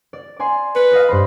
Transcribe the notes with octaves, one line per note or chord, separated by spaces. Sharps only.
D5
D5 G#5 C6
B4 C#7
D5 D#5 F5
G2 C5 B5